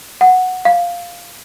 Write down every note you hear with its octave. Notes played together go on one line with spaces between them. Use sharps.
F#5
F5